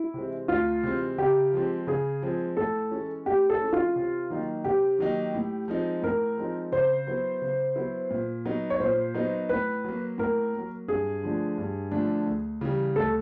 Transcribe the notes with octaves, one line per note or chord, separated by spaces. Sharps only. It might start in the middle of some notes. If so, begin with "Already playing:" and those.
Already playing: E4
C3 E3 G#3 C4
D2 F4
C3 E3 G#3 C4
C#3 G4
F3 G#3 C4
C#3 G#4
F3 G#3 C4
A2 A4
E3 G#3 C#4
A2 G4
A4
E3 G#3 C#4
F4
C3
D#3 F#3 A#3 D#4
C3 G4
D#3 F#3 A#3 D#4
A2
F3 G#3 C4 D#4
A2 A#4
F3 G#3 C4 D#4
C#3 C5
F#3 B3 E4
C#3
F#3 B3 E4
A#2
F#3 B3 D#4
C#5
A#2 C5
F#3 B3 D#4
A2 B4
F#3 A#3
A2 A#4
A#3
F#3
G2 G#4
D3 F3 A3 D4
G2
D3 F3 A3 D4
D2
C#3 E3 G3
D2 A4